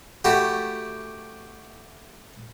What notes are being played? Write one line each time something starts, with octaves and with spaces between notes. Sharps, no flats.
A3 E4 F#4 G4